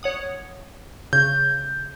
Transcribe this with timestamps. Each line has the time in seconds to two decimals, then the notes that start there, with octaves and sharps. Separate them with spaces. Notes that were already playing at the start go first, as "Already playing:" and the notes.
0.03 C#5 F#5 D#6
1.13 C#3 G6